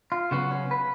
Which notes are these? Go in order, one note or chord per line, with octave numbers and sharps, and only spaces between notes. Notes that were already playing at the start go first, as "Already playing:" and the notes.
F4
C#3 F#3 B3 F#4
C#4
B4